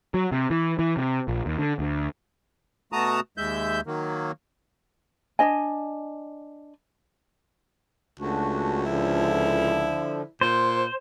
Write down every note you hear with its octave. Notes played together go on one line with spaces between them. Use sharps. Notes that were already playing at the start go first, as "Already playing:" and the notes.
F#3
C3
E3
E3
C3
A#1
D#2
D3
D2
B2 A3 F#4 A5 A#5 D#6
D#2 G#3 E5 G6
D#3 F#3 A#3
D4 D#5 G#5
C#2 A3 D4 F#4
D3 F3 E4
A#2 C5